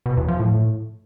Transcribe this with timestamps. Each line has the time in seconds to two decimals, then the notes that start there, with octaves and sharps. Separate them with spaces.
0.06 B2
0.17 E2
0.28 F3
0.40 A2